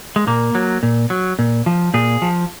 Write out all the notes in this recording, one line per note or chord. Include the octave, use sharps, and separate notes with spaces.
G#3
A#2 A#3
F#3
A#2
F#3
A#2
F3
A#2 G#4
F3